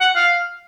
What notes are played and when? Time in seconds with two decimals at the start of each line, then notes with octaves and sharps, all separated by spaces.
0.01 F#5
0.16 F5